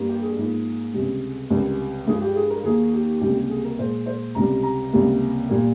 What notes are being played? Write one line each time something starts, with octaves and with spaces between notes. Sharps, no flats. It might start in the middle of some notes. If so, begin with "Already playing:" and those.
Already playing: G2 G3 A#3
G4
G#4
G#2 F3 A#3
C#2 C3 G3
C#2 C3 G3 A#4
G2 F3 G#3 G#4
G4
G#4
A#4
D#2 D#3 A#3 G#4
G4
C#2 C3 G3 A#3 G4
G4
G#4
A#4
A#2 G#3 C5
C5
C#2 C3 G3 A#5
A#5
C#2 C3 G3 A#3
A#2 G3 A#3